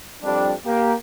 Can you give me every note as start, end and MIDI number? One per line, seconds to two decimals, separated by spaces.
0.22 0.52 41
0.22 0.52 55
0.22 0.52 62
0.66 0.94 58
0.66 0.94 67